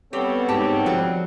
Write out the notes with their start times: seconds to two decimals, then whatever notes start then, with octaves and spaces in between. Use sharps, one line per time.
0.13 G3 B3 C4 G4 A4 C#5
0.49 G#2 G4 A5
0.86 F3 F#3